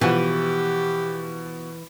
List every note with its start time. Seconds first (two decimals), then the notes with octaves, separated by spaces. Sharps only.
0.01 B2 E3 F3 G4 F#5